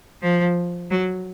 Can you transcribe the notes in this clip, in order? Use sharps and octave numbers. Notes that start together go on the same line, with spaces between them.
F3
F#3